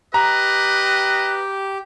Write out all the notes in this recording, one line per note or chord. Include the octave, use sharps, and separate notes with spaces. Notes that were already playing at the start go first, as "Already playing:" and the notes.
G4 B4 D#5 A#5